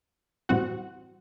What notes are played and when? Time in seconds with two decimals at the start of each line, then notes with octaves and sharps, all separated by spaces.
0.49 A2 E3 G3 C4 F#4 F#5